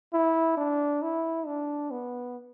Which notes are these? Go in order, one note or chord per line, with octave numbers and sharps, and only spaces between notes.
E4
D4
E4
D4
B3